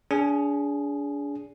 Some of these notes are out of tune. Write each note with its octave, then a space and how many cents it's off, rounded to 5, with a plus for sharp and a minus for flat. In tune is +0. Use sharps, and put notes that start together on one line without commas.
D4 -35 G#4 +0